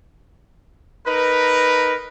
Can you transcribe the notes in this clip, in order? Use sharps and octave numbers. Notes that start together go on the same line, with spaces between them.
D#4 A#4 B4